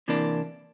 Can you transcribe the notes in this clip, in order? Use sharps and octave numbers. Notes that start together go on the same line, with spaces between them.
C3 E3 A#3 D4